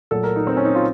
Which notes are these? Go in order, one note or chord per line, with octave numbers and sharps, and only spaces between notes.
A#2 F#3 A3 A4
A#4
D#4
C4
C#4
D#4
F4